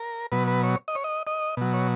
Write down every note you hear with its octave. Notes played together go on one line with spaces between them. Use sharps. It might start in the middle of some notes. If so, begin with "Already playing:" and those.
Already playing: A#4
B2 F#3 B4
B4
C#5
D#5
C#5
D#5
D#5
B2 F#3
C#5